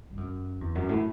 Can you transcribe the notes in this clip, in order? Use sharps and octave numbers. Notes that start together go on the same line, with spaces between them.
G2
F#2
E2
F#2
A2